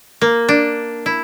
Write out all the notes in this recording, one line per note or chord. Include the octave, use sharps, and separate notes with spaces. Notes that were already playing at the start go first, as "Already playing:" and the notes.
A#3
D4
E4